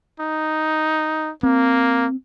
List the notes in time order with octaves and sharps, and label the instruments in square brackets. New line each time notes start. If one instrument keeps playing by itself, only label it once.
[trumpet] D#4
[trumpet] A#3 [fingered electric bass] C4